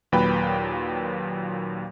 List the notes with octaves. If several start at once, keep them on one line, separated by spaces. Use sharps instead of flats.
D#2 A#2 F#3 B4 G5 B5